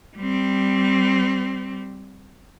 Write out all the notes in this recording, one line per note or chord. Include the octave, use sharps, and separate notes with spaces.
G3 C4